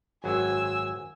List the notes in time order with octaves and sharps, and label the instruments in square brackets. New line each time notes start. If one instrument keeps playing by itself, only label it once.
[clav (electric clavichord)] G#1 F#2 F#3 [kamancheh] G#5 E6